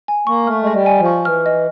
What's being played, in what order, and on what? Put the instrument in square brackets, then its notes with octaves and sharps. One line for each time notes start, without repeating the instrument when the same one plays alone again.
[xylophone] G#5
[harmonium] A#3 [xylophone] C#6
[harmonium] A3 [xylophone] F6
[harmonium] G#3 [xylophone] D#5
[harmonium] G3
[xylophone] G#5
[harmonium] F3
[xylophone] C#6
[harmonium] E3 [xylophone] F6
[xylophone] D#5